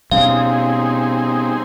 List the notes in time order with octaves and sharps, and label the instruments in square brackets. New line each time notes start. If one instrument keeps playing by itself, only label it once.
[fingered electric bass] B2 G3 C#4 [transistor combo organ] C4 D#4 G#4 [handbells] F5